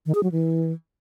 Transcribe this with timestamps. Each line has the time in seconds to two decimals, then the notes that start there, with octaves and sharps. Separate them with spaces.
0.06 D#3
0.15 G#4
0.23 F#3
0.32 E3